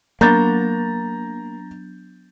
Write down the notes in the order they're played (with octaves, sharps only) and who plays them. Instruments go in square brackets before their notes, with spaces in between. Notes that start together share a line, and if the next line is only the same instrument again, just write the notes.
[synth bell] F#3 B3 D4 [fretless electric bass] A#3 [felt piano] A#5 G6 A6